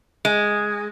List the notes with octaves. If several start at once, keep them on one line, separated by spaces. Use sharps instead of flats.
G#3